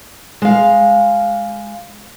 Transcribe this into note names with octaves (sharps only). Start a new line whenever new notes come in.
G#3 F5